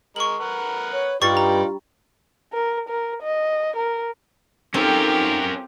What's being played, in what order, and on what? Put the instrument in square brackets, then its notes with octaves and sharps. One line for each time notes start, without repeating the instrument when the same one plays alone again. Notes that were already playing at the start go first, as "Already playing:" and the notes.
[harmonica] G#3 A#4 [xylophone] C#6 F#7
[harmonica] A#4 B4 F#5
[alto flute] C#5
[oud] G2 [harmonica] D#4 D5 [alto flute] F4 [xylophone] C#6 A6
[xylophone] A#5
[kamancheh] A#4
A#4
D#5
A#4
[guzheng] C4 A4 [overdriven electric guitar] C#4 A#4 [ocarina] D#4 [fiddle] F4 G4